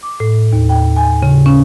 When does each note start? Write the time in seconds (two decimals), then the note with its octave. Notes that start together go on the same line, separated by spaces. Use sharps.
0.03 D6
0.20 A2
0.53 D#2
0.69 G5
0.96 G#5
1.23 C#3
1.46 C#4